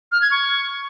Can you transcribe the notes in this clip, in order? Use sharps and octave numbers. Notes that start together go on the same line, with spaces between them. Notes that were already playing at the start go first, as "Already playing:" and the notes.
F6
G#6
C#6